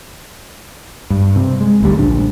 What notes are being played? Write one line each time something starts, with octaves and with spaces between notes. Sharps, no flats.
G2
C3
G#3
G#1 D2 G3
A#1 D4